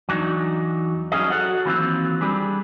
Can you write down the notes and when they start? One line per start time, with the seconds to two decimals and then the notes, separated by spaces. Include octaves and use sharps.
0.09 E2 F#3 D4 D#4
1.12 F#3 G3 C#4 G#4 D#5
1.30 F#4 A4 C#5 F#5
1.65 D#3 E3 F#3 A#3 C4 F4
2.21 G3 D4 G4 G#4